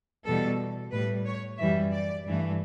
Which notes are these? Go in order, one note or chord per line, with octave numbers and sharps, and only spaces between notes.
E2 B2 G3 A4
A2 G3 B4
C#5
F#2 E3 G3 E5
D5
G2 E3 A3